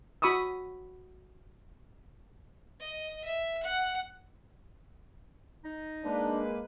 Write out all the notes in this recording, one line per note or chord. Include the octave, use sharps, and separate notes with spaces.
F#4 B5 C#6 D#6 E6
D#5
E5
F#5
D#4
G#3 A#3 D4 B4